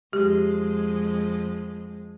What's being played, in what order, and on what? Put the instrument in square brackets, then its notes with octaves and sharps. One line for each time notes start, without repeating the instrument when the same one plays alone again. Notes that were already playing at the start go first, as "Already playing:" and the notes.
[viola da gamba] F2 G#3 [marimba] G4